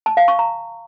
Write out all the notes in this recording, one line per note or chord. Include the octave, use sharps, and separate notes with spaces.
A5
F5
C#6
A#5